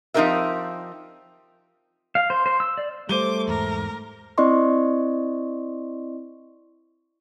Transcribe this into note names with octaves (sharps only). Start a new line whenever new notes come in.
F3 C4 D#4 G4 A#4 E5
F5
C5
C5
E6
D5
G3 A3 C5 D6 D#7 G7
E2 G#2 A#4
C4 E4 D5 D#5 C6 C#6